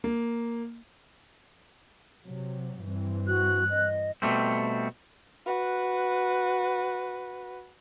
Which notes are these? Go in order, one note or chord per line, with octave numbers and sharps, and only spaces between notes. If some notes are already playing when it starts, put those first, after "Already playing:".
A#3
C3 F#3
G2 E3 C4
F#4 F#6
D#5
B2 G3 A3 C4
F#4 B4